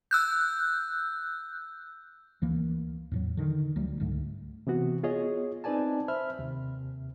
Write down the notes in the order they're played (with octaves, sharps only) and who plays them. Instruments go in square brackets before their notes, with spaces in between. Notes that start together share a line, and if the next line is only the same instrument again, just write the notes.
[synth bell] E6 F#6 G6
[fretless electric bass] D2 E3 A#3
E2 A2 F#3
D3 D#3
D2 F#3 G3 A3
C#2 G#2 D3 A3
[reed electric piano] C3 E3 B3 F#4
B3 F4 G#4 C#5 D#5
C4 D#4 B4 D5 G#5 A5
C5 E5 B5 F6
D#2 C3